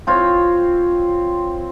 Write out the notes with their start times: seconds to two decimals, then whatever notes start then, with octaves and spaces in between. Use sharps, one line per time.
0.07 C4 F4 C#5